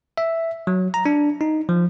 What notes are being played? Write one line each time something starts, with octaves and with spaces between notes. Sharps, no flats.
E5
F#3
A#5
D4
D#4
F3